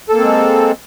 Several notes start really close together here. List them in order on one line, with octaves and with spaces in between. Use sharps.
A4 A#3 C4 G#3